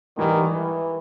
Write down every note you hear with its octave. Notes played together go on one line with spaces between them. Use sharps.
G#2 D#3 E3 G3
E3